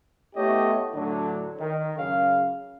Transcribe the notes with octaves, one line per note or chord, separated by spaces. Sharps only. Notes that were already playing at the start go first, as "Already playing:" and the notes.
A3 B3 E4 G4 C#5 D#5
A2 D3 F#3
D#3
F#2 C#3 F5